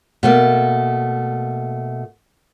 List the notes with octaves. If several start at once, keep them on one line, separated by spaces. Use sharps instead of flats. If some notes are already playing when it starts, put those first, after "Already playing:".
B2 A3 A#3